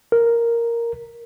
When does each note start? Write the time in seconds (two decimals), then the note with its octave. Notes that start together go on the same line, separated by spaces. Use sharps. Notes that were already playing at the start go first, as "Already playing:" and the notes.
0.12 A#4